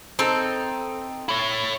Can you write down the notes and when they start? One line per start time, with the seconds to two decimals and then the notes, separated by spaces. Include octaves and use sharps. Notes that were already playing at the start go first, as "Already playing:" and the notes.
0.19 C4 D#4 A4
1.29 E4 C#5